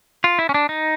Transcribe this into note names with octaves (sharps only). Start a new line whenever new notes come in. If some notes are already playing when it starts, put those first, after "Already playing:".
F4
E4
C#4
D4
D#4